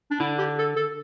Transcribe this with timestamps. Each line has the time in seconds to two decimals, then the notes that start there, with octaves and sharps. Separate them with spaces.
0.11 D4
0.20 D3 E4
0.38 G4
0.58 A4
0.76 A4